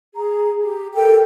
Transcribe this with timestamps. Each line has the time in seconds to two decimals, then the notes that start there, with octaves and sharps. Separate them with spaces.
0.16 G#4 A#5
0.62 G4
0.95 A4 A#4 G5